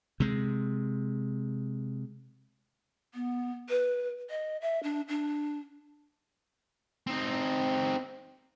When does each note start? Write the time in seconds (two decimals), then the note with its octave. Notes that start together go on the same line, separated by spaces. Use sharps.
0.20 C3 G#3
3.14 B3
3.69 B4
4.30 D#5
4.62 E5
4.83 D4
5.08 D4
7.07 C4 D#4